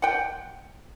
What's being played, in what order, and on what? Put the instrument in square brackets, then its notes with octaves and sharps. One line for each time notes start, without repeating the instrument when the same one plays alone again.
[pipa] F#5 G5